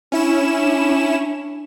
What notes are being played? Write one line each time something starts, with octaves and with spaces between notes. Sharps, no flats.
C#4 D4 E4 E7